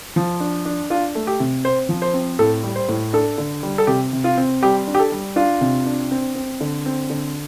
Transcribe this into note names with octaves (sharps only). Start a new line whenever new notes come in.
F3
D4
D4
D4 F4
A3
G4
C3
C4 C5
F3
C5
C4
A2 A4
G3
C5
A2
D4 A4
D3
G3
A4
C3 G4
C3
F4
C4
G3 G4
D4
G4
A4
G3
D4 F4
C3
D4
C4
C4
D3
C4
D3